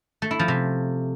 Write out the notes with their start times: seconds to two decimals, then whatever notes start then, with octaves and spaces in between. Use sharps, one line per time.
0.22 A3
0.31 E4
0.39 F3
0.48 C3